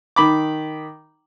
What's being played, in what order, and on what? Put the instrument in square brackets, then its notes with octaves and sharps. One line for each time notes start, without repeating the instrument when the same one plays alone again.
[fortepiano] D#3 B5 D6